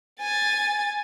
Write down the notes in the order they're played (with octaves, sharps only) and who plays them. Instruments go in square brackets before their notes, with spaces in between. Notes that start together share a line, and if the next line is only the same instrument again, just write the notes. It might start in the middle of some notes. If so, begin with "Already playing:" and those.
[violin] G#5 A6